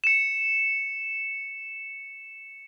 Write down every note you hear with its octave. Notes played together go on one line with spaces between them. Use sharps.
C#7 E7